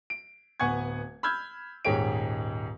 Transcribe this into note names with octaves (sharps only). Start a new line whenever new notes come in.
D7
D1 B3 F#5 G#5 C#6 G#6
B5 E6 F6 G6 G#6
D#1 G#2 G#3 G4 C#5 D7